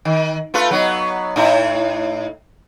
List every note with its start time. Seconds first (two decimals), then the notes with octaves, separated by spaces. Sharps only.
0.05 D#3
0.54 A3 F4 B4
0.71 F#3 B3 D#4
1.36 A2 D#4 E4